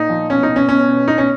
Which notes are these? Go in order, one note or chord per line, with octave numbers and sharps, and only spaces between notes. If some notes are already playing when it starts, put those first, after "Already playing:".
Already playing: A#2 D#4
F3
B2 C#4
D#4
B2
C#4
B2 C#4
B2
B2 D#4
C#4